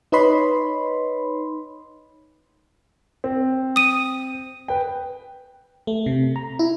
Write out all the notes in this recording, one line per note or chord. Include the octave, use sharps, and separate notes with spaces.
D#4 B4 C#5 D#5 B5 C6
C4
D#6 D#7
B4 G5
A3
C3
A#5
E4